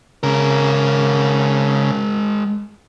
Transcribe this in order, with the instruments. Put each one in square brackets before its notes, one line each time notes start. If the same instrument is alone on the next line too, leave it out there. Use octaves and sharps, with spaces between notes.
[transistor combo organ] C#3 [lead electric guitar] G#3 A#4